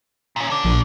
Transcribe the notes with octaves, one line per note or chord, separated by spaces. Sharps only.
A#2 C#4
A4 D5
A#1